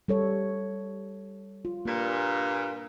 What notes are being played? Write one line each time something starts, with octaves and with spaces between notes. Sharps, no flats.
G3 A4 C#5
F4
G2 A#2 A#3